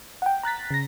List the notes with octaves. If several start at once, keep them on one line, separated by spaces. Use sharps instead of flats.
F#5 G5
A#5 F#6 A6 B6
C#3 A#6